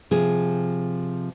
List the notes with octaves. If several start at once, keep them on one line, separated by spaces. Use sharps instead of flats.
C3 F3 G#4